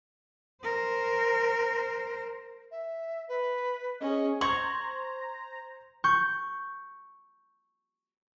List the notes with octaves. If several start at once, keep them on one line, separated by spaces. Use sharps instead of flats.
A#4 C5
E5
B4
C#4 G#4 D#5
C5 A#5 C6 C#6 G#6 F#7
C#6 G6